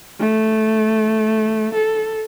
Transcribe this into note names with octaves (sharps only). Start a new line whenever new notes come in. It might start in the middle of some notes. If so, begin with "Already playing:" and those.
A3
A4